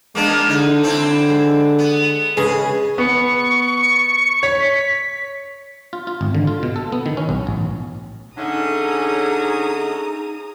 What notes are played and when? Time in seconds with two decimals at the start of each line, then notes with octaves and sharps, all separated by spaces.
0.15 G#3 A#3 B3 D4
0.49 D3 D#4
0.83 D3 C4 D4 E4
1.30 G#3
1.79 B3
2.37 C#3 G#3 G#4 B4
2.98 B3 C#6
4.43 C#5 B6
5.93 F4
6.07 F4
6.21 G#1
6.35 D3
6.47 F4
6.63 B2
6.76 A4
6.92 B3
7.06 D#3
7.17 C#4
7.29 B1
7.47 A1
8.38 D3 A3 C#4 D#4 G#4 A#5 D#6